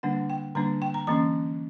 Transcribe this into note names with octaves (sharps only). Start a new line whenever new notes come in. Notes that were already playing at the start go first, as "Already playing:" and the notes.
D3 G3 A#3 D4 F#5
G5
D3 G3 A#3 D4 A#5
G5
A#5
E3 A#3 C#4 A#5